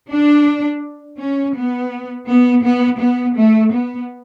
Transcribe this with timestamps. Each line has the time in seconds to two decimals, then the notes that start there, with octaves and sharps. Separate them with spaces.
0.12 D4
1.20 C#4
1.56 B3
2.27 B3
2.64 B3
3.00 B3
3.35 A3
3.72 B3